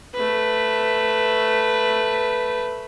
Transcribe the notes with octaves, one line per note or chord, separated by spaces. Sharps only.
A3 B4